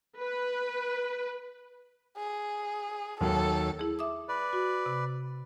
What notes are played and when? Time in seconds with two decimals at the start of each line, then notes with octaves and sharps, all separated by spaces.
0.18 B4
2.18 G#4
3.21 D#2 D#3 F#3 A4
3.79 E4 G#4
3.99 E5 D6 D#6
4.29 B4 D5
4.53 F#4
4.86 C3